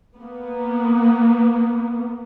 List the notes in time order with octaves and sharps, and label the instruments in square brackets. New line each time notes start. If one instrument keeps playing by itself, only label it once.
[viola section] A#3 B3